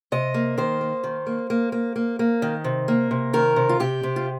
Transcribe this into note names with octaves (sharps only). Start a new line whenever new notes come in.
C3 D#5
A#3
D#3 C5
A#3
D#3
A#3
A#3
A#3
A#3
A#3
D#3
C3
A#3
C3
D#3 A#4
C3
F4
C3 G4
C3
F4